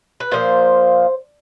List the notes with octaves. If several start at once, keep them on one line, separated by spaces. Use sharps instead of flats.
B4
A#2 F3 A#3 C5